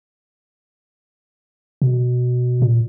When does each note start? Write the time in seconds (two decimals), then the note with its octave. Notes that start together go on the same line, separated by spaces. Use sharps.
1.82 B2
2.62 A#2